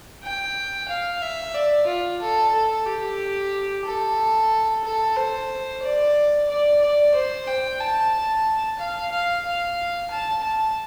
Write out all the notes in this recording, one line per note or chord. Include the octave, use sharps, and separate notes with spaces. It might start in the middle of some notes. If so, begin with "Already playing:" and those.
G5
F5
E5
D5
F4
A4
A4
G4
A4
A4
C5
D5
D5
D5
C5
G5
A5
F5
F5
F5
A5
A5